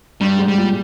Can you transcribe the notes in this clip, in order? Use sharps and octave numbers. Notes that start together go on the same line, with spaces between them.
G2 G3
G#2
G3
A#2